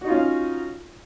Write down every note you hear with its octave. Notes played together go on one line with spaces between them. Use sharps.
C#4 D#4 F4 F#4 F5